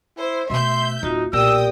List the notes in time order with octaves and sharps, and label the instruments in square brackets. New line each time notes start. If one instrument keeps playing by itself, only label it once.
[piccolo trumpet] E4 [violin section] C5
[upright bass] B2 A3 [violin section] E5 G6 [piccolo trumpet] C6
[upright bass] D1 [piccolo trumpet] D#4 [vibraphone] F4 F#4
[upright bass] B1 A#2 [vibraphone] G4 A#4 D5 [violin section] G5 D#6 [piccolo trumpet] E6